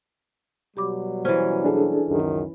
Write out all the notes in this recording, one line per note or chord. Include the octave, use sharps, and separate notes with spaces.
B2 F#3 G3 G4 B5 D6
E3 C#4 C5
D4 G#4 A4
C#2 F#2 D#3